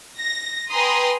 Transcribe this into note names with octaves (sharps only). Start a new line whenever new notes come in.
A#6
B4 G5 G#5 A#5 C6 D#6